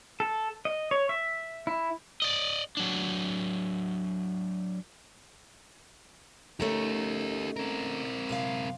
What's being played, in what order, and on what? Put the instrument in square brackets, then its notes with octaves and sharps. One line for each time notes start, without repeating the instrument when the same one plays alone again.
[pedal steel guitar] A4
D#5
C#5
E5
E4
[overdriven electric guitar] D5 D#5
F#3 D4
[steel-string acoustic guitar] A3 C#4 D#4 [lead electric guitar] G4 A#4
[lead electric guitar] C4 A#4
[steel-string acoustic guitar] F#2 C3 F5